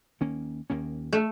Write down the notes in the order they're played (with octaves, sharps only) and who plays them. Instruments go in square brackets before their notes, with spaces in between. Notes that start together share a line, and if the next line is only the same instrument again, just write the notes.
[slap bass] D#2 D#3 A#3 C#4
D#2 D#3 A#3 C#4
[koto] A3